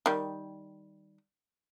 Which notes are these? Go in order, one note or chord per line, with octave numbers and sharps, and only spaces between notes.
D#3 G3